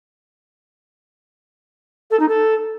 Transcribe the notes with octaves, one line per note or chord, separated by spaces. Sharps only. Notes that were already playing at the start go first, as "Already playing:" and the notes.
A4
D#4
A4